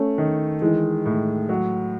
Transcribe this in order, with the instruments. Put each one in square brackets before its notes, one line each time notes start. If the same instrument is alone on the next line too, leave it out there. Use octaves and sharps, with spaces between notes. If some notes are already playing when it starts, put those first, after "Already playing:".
Already playing: [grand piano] A3 [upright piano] C#4
[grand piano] D#3
[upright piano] E3 [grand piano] G#3
[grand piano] A2
F#3